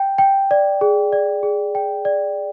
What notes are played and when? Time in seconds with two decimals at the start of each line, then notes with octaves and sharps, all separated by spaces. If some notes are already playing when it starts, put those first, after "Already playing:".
Already playing: G5
0.18 G5
0.51 D5
0.81 G#4
1.13 D5
1.43 G#4
1.75 G5
2.05 D5